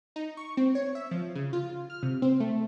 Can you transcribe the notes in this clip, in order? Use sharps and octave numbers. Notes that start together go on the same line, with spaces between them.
D#4
C#6
C4
C#5
E5
F3
C#3
F4
F6
C3
C4
A3